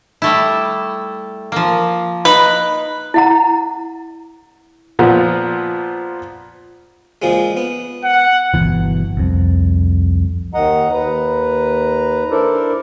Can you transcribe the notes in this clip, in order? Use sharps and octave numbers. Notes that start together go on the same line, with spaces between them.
G3 A3 E4
F3 A#3
D#4 B4
E4 F#5 A#5
A#2 F3 B3
A#2 F3 G#3
B3
F#5
G1 C#2 B2 E3
C2 F2
D#2 D#3 D#5 F#5 A#5
D#2 B4 A#5
D4 E4 A4 A#4 C5 D5